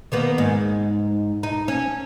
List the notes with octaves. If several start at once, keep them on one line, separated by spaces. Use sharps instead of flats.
D#3 A#3 B3
G#2
D#4
C#4